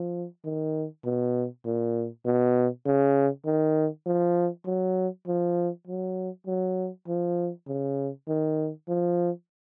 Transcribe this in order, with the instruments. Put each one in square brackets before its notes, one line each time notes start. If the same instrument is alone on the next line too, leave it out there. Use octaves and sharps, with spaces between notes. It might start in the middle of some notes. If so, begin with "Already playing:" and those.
Already playing: [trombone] F3
D#3
B2
A#2
B2
C#3
D#3
F3
F#3
F3
F#3
F#3
F3
C#3
D#3
F3